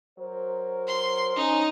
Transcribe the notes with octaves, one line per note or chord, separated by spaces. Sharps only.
F#3 A#4 C5
C6
C#4 D#4